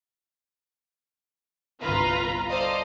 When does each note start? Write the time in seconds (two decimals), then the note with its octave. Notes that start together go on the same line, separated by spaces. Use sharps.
1.82 G1 C2 F4 B4 A#5
2.49 A4 C5 D5 D#5 F5